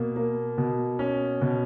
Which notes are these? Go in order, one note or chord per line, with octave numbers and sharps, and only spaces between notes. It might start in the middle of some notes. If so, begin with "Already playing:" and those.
Already playing: B2 A#3
A#3
B2
C#4
B2